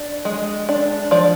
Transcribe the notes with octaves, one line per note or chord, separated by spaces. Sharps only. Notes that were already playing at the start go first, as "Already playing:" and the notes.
Already playing: D4
G#3
D4
F3 D5